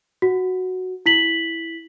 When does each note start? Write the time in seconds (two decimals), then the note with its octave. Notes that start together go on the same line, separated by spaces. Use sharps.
0.22 F#4
1.06 E4 B6 F#7